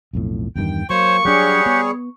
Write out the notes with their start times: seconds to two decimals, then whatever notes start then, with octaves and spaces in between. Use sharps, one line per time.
0.13 B1 F2 A2
0.56 E2 G2 D#3 G5
0.90 F#3 A#3 C5 C#5 C#6
1.25 F#3 G3 D4 G4 G#4 C#5 F#5
1.66 B3